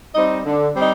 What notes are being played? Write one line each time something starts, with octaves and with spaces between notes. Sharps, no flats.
G3 C4 D#4 D#5
D3
G3 C4 D#4